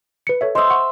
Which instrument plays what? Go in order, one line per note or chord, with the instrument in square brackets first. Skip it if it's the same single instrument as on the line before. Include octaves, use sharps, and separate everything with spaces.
[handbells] B4 C#7
A4 C#5 E5
[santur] C5 E5 [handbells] D#5 D#6
[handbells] F#5 C#6